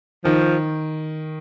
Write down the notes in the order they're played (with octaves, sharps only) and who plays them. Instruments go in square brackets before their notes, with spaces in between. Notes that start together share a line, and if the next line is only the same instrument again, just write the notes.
[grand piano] D#3 [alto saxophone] F3